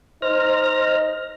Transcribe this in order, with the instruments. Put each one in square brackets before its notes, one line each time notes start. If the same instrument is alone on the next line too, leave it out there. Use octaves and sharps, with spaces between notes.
[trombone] D#4 [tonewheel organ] C5 F6 A#6